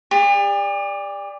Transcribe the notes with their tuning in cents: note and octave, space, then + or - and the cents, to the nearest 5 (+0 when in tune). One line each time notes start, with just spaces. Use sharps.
G4 +45 D5 +0